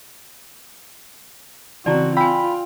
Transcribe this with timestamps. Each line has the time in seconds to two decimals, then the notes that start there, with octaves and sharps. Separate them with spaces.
1.86 C#3 E3 C4 F#4 D5 A5 A#5
2.17 F4 G5 G#5 B5 E6